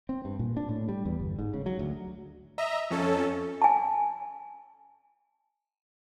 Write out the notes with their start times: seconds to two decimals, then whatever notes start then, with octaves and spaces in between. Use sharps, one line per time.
0.09 C4
0.25 G2
0.39 A#2
0.57 D4
0.69 A2
0.89 G3
1.05 E2
1.19 G1
1.39 G#2
1.54 C#3
1.66 F#3
1.79 D2
2.58 D#5 E5 A#5
2.91 F2 C#4 A4
3.62 G#5 A5